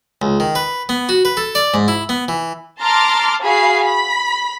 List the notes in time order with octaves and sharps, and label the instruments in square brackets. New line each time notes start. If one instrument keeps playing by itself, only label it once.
[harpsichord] C#2
D#3
B4
B3
F#4
B4
A4
D5
G#2
E4
B3
E3
[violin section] A5 A#5 C6 D6 F6
F#4 G#4 F5 B5 C7
B5 B6